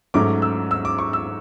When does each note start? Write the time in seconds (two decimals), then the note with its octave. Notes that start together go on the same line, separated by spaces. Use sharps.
0.14 G#2 F#3 A3 C#4 D6
0.42 E6
0.71 E6
0.85 D6
0.99 C#6
1.13 E6